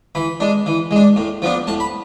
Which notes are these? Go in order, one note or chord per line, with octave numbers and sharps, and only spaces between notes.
E3 B5
G#3 D4
E3
G#3
D4
A2
F3 B3 D4
A2 A5
B5